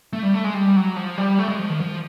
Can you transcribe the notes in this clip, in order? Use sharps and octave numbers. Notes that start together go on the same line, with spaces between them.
A3
G3
A3
G#3
G3
F#3
F3
G3
A3
G#3
F3
D#3
F3